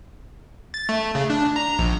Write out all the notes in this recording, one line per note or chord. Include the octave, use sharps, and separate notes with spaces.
A6
A3
C#3
D4
A#5
A#1